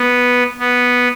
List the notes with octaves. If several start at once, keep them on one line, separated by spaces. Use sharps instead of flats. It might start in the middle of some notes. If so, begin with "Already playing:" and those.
Already playing: B3
B3